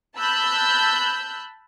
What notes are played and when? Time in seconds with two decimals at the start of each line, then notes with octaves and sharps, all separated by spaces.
0.16 A5 B5 E6 F#6 G6